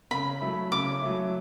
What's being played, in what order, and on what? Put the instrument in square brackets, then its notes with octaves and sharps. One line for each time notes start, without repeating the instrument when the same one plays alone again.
[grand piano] C#3 [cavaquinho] B5
[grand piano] F#3 A3 E4
[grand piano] C#3 [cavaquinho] D6
[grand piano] F#3 A3 E4